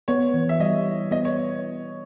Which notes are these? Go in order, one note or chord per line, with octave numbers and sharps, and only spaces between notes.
B3 C#5
E3
E5
G3 D#5
E4
B3 D#5
C#5